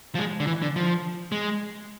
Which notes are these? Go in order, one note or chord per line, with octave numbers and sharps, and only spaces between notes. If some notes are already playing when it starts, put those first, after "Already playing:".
F3
G#3
D3
E3
D3
F3
G#3